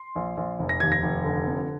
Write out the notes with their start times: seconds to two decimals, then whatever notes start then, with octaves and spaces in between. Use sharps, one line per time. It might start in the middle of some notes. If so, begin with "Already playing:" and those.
Already playing: C6
0.15 A#1
0.37 A#1
0.59 F1
0.69 A#6
0.80 D#2 G#6
0.92 A#6
1.02 F1
1.25 D3
1.46 F2